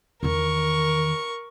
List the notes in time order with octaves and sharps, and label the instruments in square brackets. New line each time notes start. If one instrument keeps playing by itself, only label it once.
[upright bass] E2 D#3 [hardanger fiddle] A#4 C#6